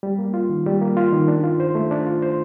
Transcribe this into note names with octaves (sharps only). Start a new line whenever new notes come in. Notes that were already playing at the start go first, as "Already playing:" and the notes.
G3
A#3
F4
D#3
G3
A#3
F4
D#3
D4
F4
C5
A3
D4
F4
C5